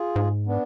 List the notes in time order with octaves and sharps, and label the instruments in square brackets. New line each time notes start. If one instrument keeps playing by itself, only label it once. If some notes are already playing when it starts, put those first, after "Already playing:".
Already playing: [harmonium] F4 G#4
[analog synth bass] G#2
[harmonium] B3 D4